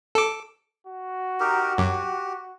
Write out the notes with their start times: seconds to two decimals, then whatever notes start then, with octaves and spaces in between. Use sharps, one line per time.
0.15 A4 D6
0.86 F#4
1.40 D#4 G4 A#4
1.78 F#2 G4